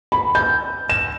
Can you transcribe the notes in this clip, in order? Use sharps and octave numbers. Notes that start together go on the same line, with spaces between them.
B5
G6
E7